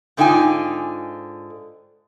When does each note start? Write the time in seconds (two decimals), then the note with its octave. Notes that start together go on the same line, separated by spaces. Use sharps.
0.17 G#2 D3 D#4 F4 G5 G#5